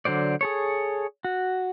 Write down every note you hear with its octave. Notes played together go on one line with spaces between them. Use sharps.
D3 F#3 C5 D5
G#4 A4 C#5
F#4